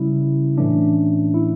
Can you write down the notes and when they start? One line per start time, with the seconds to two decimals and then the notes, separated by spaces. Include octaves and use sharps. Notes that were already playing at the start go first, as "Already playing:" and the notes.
Already playing: C#3 G3 C#4 E4
0.58 A2 E3 A3 C#4 D4
1.34 E4